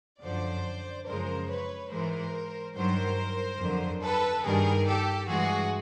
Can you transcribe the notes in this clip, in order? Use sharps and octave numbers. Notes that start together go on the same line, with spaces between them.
F#2 D3 F3 C5 D5
F#2 C#3 F3 G#3 A#4 C5
B4 C#5
G#2 E3 G#3 A#4 C5
G2 D#3 F#3 A#4 C5
F2 D3 F#3
A4 B4
G2 D#3 G3 G#4 A#4
G4 A4
G2 E3 G#3 F#4 G#4